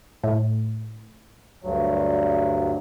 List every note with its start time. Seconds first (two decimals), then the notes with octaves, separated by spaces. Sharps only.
0.23 A2
1.63 D2 G2 F#3